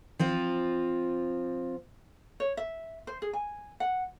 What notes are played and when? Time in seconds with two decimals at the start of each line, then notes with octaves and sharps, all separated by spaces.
0.19 F3 C4 F4
2.40 C#5
2.57 E5
3.07 C5
3.22 G#4
3.33 G#5
3.80 F#5